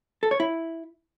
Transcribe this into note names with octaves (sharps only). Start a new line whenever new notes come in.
A4
C#5
E4